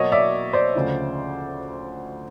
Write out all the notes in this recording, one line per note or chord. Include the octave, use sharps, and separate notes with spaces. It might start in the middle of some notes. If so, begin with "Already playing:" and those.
Already playing: B2 F#3 A#3 C#5 D#5
D5 E5
C5 D5
D2 C#3 F3